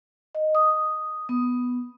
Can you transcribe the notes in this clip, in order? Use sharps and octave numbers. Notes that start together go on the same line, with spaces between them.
D#5
D#6
B3